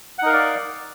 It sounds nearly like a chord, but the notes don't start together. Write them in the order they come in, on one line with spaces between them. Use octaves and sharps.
F#5 D#4 A#4 F5 D5